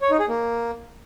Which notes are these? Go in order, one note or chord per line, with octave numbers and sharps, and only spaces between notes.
C#5
D#4
G#4
A#3